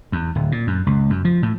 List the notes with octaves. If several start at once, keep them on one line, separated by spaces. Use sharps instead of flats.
E2
D1
A#2
F#2
C#2
F#2
F3
A2